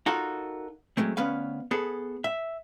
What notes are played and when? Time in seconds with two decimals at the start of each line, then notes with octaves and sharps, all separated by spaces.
0.06 D#4 F4 F#4 A4 A#4
0.97 F#3 G#3 A3 C4
1.17 D2 B3 C#4 B4 F5
1.71 B3 G#4 A4
2.24 E5